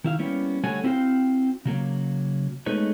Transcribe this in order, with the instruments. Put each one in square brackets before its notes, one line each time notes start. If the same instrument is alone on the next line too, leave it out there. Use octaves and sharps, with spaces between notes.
[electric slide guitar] D#3 E4 F5
G3 A#3 B3 C#4 E4
D3 G3 A3 F#4 C#5 G#5
C4 E4 F#4 B4 F5 G5
C#3 F#3 A#3
G#3 A3 B3 D#4 B4 C#5